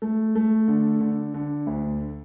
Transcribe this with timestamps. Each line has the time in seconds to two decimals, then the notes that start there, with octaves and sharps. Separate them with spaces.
0.02 A3
0.35 A3
0.68 D3
1.01 D3
1.34 D3
1.66 D2